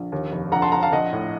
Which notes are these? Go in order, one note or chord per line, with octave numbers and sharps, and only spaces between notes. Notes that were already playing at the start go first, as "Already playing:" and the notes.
Already playing: A#1
D#2
F1
A#1 F#5 A#5
A5 C6
A#1 F#5 A#5
F5 A5
A#1 D#5 F#5
A2